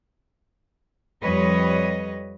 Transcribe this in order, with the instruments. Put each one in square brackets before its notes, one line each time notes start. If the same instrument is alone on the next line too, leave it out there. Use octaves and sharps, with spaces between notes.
[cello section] F2 G3 B4 C#5 D#5